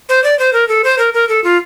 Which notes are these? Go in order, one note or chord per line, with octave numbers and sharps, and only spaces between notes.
C5
D5
C5
A#4
A4
C5
A#4
A#4
A4
F4